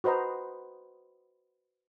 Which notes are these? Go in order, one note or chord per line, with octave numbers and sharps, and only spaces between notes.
F#4 B4 C5 D#5 A#5